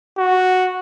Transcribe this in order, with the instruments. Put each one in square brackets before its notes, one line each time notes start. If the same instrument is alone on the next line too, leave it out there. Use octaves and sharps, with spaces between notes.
[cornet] F#4